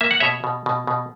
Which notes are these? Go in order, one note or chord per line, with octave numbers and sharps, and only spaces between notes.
A#3 E5
F#5
B2 C#5 E5
B2
B2
B2